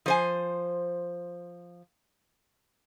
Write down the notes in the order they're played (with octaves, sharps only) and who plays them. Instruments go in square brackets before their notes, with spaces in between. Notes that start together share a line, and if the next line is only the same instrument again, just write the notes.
[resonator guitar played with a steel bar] F3 C5 G#5